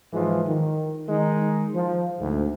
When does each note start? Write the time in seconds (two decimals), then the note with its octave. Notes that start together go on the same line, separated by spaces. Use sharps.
0.13 G#2 E3 F3 G#3
0.46 D#3
1.09 D#3 G#3 D#4
1.75 F3
2.20 D2 G#2